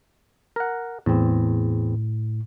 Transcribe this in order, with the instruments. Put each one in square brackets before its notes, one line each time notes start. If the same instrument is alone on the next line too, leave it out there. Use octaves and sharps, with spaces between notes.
[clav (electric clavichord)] A#4 F#5
[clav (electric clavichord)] E2 C4 [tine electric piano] A2